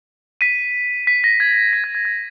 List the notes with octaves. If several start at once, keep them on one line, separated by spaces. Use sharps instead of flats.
B6 D#7
B6
A#6
G#6
B6
G#6
G#6
G#6